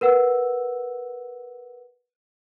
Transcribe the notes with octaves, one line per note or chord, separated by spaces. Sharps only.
A#4 B4 F#5 E6